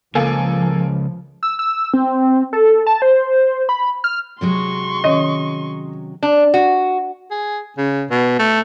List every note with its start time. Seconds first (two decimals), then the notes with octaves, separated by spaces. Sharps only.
0.15 C#2 F3 A#3 A4 G#5
1.43 E6
1.59 E6
1.94 C4
2.53 A4
2.86 A5
3.02 C5
3.69 B5
4.04 F6
4.41 C3 F#3 G#3 C6 C#6
5.04 D#3 C#4 C#5 D#5
6.23 D4
6.54 F#4
7.31 G#4
7.78 C#3
8.11 B2
8.39 A3